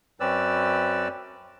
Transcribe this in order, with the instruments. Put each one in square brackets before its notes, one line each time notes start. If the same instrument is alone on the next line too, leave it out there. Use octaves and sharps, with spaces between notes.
[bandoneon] F#2 C4 C#4 B4 D5 E6